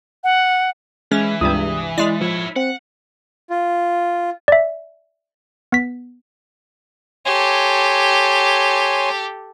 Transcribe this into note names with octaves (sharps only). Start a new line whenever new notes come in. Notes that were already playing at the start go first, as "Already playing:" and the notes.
F#5
E3 G#3 C#4
C#2 G2 C3 D#6
G#3 E4 D5
F3 E4 C#5
C4 F#5
F4
D5 E5
B3 B6
G4 A4 C#5 G#5 C6